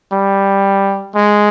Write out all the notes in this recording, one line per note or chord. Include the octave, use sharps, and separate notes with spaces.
G3
G#3